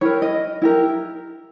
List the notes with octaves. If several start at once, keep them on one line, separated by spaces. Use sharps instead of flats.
E4 G4 A#4 C#5
D#5
E4 G4 A#4